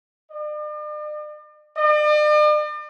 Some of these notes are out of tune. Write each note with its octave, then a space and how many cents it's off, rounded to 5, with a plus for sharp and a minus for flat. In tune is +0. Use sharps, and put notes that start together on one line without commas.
D5 +45
D5 +45